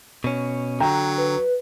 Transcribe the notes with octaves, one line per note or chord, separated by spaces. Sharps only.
B2 C#4
D3 F#3 G5 A#5
B4